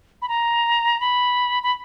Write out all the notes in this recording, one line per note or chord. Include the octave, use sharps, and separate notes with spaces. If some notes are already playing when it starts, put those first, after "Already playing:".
B5
A#5
B5
B5